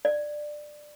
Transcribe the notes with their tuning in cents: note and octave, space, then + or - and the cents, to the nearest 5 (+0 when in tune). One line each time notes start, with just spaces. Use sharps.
D5 +15